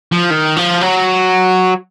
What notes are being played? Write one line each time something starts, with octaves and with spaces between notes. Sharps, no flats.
F3
D#3
F3
F#3